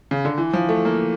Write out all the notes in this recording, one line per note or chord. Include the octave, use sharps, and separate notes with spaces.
C#3
D3
E3
F3
A3
A#3